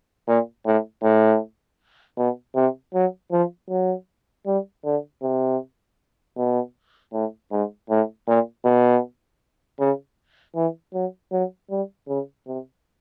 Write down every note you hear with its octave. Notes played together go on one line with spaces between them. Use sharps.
A#2
A2
A2
B2
C3
F#3
F3
F#3
G3
D3
C3
B2
A2
G#2
A2
A#2
B2
C#3
E3
F#3
F#3
G3
C#3
C3